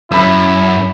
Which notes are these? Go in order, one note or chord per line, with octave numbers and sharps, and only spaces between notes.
F#2 E4 E5 B5